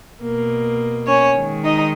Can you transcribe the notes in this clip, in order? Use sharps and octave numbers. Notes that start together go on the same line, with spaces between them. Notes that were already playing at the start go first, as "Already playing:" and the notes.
B2 A#3
C#4 C#5
D#3 G#3
D#4 D#5